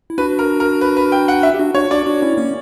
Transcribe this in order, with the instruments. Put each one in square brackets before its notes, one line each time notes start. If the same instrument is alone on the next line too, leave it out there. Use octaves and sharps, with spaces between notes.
[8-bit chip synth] E4
[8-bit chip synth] D4 F#4 [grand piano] B4
[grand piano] A#4
A#4
B4
B4
G5
F#5
E5
[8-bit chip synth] G4
D4 F#4
[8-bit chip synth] D4 F#4 [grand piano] C#5
[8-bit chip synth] D4 F#4 [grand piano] D5
[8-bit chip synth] D4 F#4
C#4 E4
A#3 C#4